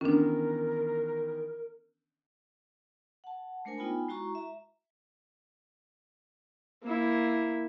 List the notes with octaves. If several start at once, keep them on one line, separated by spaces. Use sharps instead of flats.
D#3 E3 B3 C#4 D4 A#4
F#5 A5
G#3 A3 D4 A#4 C5 G#5
B3 D#4 F4 G5 G#5 B5
G#3 E4 F#4 A#5 C#6
E5 A#5
A#3 E4